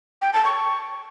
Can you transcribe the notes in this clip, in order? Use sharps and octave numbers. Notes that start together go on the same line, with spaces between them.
G5
A5
C#6